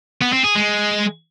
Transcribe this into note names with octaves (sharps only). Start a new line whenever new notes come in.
B3
C4
G#4
G#3